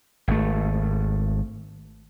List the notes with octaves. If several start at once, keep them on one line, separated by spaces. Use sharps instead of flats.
G#1 A3